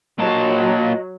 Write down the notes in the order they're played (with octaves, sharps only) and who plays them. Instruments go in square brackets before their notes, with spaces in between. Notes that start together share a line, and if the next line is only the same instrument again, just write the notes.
[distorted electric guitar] A#2 A5 [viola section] F#3 [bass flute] D#5